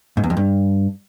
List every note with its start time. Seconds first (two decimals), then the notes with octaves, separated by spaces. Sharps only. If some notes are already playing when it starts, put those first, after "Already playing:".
0.17 G#2
0.24 E2
0.30 F2
0.37 G2